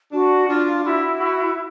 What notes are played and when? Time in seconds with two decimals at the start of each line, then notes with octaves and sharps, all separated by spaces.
0.12 D4 F#4
0.48 D4 F4
0.84 E4 F#4
1.20 F#4